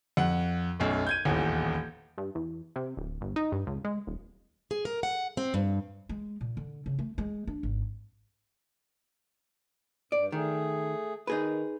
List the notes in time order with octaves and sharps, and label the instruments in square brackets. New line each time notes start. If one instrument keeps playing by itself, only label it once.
[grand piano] F2 F#5
B1 F#2 A3
G6 G#6 D#7
D#1 A1 E2
[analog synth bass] G2
E2
C3
D1
G1
D#4
G2
C#2
G#3
D#1
[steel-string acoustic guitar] G#4
A#4
F#5
C4
G2
[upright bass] G#3
A#2
D3
C#3
A3
G#3
D4
G#1
[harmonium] G2 [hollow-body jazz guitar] D5
[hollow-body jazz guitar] D#3 [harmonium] A3 G#4
[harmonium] D#3 [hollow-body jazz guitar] D#4 G#4 B4